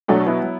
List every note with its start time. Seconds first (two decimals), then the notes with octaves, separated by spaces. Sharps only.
0.08 B2 F#3 A3 D4
0.26 B3 E4
0.43 F#3